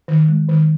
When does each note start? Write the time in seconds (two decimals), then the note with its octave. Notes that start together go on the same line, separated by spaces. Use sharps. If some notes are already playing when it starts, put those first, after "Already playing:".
0.08 D#3
0.28 G#3
0.49 D#3